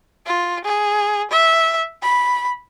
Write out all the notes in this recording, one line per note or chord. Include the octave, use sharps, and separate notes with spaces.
F4
G#4
E5
B5